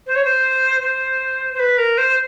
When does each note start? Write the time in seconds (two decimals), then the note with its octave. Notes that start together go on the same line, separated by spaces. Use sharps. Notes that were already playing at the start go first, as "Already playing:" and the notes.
0.07 C5
0.15 C#5
0.24 C5
0.82 C5
1.54 C5
1.59 B4
1.78 A#4
1.97 C5